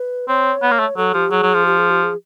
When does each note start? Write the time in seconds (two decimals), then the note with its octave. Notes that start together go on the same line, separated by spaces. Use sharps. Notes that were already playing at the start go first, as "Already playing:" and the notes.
Already playing: B4
0.28 C4 C#5
0.63 B3
0.71 A#3
0.79 A3
0.97 F#3 A4
1.14 F3 G4
1.31 F#3 G#4
1.43 F#3
1.54 F3
1.66 G4
1.78 G#4
1.90 G4
2.03 G#4